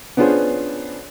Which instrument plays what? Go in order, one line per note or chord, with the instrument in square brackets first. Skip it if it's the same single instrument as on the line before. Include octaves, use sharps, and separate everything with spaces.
[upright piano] B3 C#4 D4 F4 G#4 C5